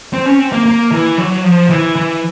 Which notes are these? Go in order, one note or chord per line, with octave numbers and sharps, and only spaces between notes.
C4
C#4
C4
A#3
A#3
E3
F#3
F3
E3
E3